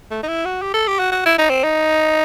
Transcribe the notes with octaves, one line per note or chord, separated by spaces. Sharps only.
A3
D#4
E4
F#4
G4
A4
G4
F#4
F#4
E4
D#4
C4
D#4